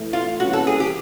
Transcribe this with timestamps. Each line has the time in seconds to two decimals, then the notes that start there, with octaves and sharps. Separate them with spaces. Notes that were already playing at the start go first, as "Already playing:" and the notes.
Already playing: A2 E3 A3
0.13 F4
0.40 E3 G3 A#3 C#4 F#4
0.53 A4
0.67 G#4
0.80 G4